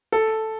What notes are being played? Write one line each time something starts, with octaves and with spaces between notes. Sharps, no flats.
A4